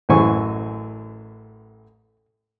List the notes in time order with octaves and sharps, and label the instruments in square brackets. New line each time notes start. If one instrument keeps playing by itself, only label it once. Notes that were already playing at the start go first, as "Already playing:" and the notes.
[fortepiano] A1 F#2 E3 C5 G#5 C#6